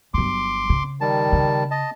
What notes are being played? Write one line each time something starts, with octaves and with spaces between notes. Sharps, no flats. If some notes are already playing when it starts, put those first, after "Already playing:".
G1 F#3 C6 D6
C#3
D#3 G3 A5
C#3
D#5 A5